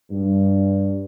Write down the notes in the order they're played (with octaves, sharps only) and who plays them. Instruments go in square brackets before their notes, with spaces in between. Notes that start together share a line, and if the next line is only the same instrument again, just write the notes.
[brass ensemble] G2